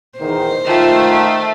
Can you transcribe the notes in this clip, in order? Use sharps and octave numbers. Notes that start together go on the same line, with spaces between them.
E2 D#3 C5
D#3 A3 F4